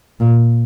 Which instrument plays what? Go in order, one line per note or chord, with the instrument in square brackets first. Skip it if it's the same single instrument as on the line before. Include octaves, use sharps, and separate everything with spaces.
[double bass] A#2